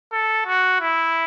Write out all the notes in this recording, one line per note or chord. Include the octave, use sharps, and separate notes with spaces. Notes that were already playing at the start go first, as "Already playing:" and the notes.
A4
F#4
E4